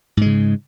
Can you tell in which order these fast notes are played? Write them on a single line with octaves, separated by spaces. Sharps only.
G#2 G#3 C#3